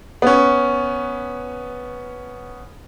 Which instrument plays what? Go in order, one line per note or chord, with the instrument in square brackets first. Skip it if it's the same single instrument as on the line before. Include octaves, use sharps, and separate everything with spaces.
[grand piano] B3 C#4